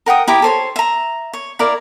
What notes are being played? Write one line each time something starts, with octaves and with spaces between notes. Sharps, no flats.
A#4 F#5 G5 D#6
E4 G4 A#5
A4 C5 C#5
E5 A#5
C#5
E4 A#4 D5 F5